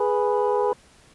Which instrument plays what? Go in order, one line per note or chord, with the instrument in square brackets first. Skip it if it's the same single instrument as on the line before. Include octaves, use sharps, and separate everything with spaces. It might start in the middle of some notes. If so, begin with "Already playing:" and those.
Already playing: [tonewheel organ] G#4 B4